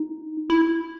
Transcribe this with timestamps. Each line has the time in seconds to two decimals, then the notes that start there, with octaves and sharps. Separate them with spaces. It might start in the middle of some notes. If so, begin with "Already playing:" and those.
Already playing: D#4
0.50 E4